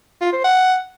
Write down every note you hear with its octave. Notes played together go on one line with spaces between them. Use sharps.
F4
C5
F#5